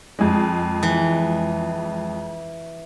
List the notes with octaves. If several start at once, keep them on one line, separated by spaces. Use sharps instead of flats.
F2 G#3
E3